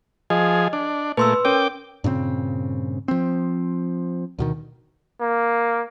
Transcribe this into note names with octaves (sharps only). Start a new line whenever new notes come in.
F3 G#4 D#5
D4
A#2 A3 B4 C6 E6
C#4 A#4 C#5 G5 D6
G2 A#2 C#3 C4
F3 C4
D2 B2 D#3
A#3